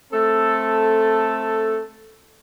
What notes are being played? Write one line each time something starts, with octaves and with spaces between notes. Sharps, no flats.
A3 C4 A4